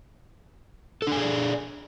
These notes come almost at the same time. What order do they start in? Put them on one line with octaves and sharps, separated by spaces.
A4 D4 G#5 G#4 D5